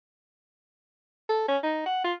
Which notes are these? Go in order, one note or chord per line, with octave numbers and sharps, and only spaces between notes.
A4
C#4
D#4
F#5
F4